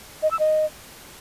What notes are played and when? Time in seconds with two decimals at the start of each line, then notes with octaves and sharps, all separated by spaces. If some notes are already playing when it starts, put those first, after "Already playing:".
0.22 D#5
0.31 E6
0.39 D#5